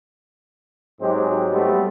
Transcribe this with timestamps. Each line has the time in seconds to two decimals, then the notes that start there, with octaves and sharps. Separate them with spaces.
1.01 G#2 F#3 G#3 C4 G4
1.52 F#3 G3 A3 B3 C4